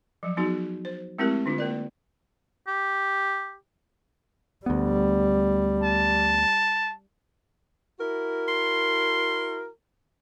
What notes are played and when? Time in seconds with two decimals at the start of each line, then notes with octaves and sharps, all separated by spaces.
0.23 F3 F#3
0.37 F#3 B3 D#4 F#4 G#4
0.85 C5
1.19 G#3 A3 C4 E4 G4 A#4
1.46 D3 D4 F4
1.58 A#3 A#4 D5
2.68 G4
4.66 D2 G3 B3
5.83 A5
7.99 E4 F#4 A#4
8.48 C6